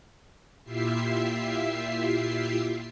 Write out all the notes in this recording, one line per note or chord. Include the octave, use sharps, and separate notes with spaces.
A#2 E4 F4 G4 E5 C7